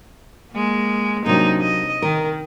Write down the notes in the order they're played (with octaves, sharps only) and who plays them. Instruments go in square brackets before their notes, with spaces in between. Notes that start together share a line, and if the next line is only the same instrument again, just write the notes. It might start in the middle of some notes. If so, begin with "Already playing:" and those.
[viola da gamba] G#3 A#3
[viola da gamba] C3 D4 D#4 [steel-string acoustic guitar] F#3 A#3
[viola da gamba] D#5
[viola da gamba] D#3 [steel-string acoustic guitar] A#4